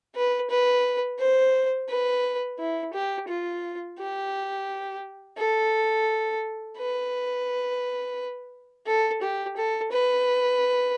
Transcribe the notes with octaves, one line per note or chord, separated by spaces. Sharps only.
B4
B4
C5
B4
E4
G4
F4
G4
A4
B4
A4
G4
A4
B4